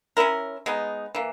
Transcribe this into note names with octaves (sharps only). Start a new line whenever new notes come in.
C#4 E4 A#4
G#3 B3 D#4
E3 A#3